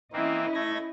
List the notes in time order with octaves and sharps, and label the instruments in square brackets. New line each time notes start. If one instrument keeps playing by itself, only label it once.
[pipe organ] E3 A#3 C4 [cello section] C#4 E4 D#5
[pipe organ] A3 G#6 A#6